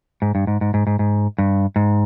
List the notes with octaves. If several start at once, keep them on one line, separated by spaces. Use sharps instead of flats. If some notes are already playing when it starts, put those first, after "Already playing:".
G#2
G2
G#2
G#2
G#2
G#2
G#2
G2
G#2